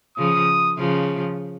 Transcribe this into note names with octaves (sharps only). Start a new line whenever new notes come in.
C#3 F3 D#6
C#3 F3